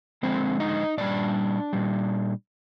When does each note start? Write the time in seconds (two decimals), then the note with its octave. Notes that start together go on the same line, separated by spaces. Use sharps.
0.23 D3 F3 G#3 C4 C5
0.60 D#4 D#5
0.98 A#2 G3 D4 D5
1.73 A#2 G3